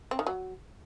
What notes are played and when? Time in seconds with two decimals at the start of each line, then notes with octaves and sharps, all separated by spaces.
0.11 C4
0.19 D#3
0.27 F#3